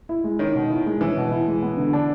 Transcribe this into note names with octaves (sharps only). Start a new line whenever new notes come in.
E4
G#3
D#3 C#4
B2
E4
G#3
E3 C#4
B2
E4
G#3
B3
D3
D4